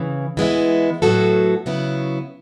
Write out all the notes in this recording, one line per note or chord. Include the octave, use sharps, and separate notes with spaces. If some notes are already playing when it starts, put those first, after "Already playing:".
Already playing: C#3 E3
E3 G#3 B3 E4
A2 F#3 B3 F#4 A4
C#3 F#3 B3 E4